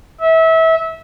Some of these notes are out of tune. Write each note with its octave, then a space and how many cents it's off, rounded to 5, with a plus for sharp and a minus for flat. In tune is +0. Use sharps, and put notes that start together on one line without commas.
E5 -25